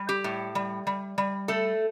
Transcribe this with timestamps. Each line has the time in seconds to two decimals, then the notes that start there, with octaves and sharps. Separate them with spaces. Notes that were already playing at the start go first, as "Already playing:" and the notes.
Already playing: G3
0.09 G4
0.24 A2
0.55 G3
0.87 G3
1.18 G3
1.48 A3 A4